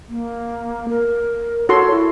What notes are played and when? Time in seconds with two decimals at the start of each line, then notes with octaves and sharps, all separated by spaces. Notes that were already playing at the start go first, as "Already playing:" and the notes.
0.09 A#3
0.89 A#4
1.69 F#4 A4 C#5 C6
1.91 E4